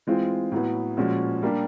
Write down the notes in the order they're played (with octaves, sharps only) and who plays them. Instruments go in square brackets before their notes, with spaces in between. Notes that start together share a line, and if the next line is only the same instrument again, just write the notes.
[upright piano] E3 G#3 C4 F4
A2 F#3 B3
A#2 F3 G#3 C#4 F#4
G3 A#3 D4 G4